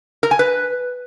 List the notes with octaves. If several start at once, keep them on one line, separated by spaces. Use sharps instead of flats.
A#4
G#5
B4